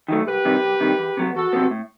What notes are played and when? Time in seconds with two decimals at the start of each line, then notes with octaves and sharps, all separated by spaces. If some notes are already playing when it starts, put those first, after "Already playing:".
0.08 D#3 F#3 A3
0.27 C2 G4 B4
0.45 C3 D#3 G3
0.64 C2
0.80 C3 D#3 G3
0.98 E2
1.17 C3 F#3 B3
1.35 E2 F#4 A4
1.53 C3 F#3 B3
1.71 A2